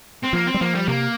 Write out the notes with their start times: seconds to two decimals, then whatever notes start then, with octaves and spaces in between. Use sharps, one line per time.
0.23 C4
0.33 F3 A#3
0.47 C4
0.54 G3
0.61 F3 A#3
0.75 G3
0.88 C3 A#3